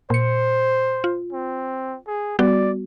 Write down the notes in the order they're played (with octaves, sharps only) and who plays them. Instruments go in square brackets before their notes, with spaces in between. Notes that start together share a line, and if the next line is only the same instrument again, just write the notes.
[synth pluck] A#2 C#7 [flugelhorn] C5
[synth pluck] F4
[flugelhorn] C4
G#4
[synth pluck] G3 B3 F#4 [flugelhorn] D5